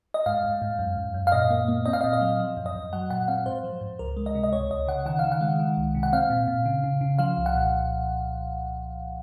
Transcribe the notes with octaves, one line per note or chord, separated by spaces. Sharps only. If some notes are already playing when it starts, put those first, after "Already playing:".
D#5
G#2 F5
G#2
G#2
F#2
F#2
F#2
F5
A#2 D#5
A#3
A#3
C4 D#5
F5
A#2 D#5
D#5
F#3
F3
F#2
D#5
F#2
F#3 F#5
A#2 F#5
C4 F5
G#2 C5
F3
G#2
C#2 A#4
G#3
D#5
C3
D#5
C#2 C#5
C#2 D#5
C#3 F#5
D#3 F#5
D#3 F5
F#5
G#3
D#3
C2
C3
F#5
C4 F5
A#2
A#2
C#3
C#3
C#3
F3 F5
C2
F#5
A#2